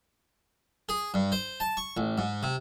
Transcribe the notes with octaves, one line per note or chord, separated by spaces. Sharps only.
G#4
G2
C5
A5
C#6
A1
G#2
C3